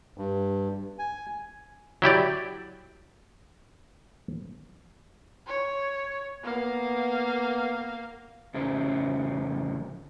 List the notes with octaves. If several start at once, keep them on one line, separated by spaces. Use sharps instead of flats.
G2
G#5
F#3 E4 G4 D5
C#5
A#3 B3 F5
F2 A2 C#3 C#4 C5